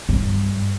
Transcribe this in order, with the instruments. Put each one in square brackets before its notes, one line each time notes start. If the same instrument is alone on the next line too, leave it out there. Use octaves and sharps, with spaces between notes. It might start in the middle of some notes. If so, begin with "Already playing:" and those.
[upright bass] G2